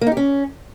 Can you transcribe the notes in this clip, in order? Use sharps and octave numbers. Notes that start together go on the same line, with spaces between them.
A#3
D#4
G4
C#4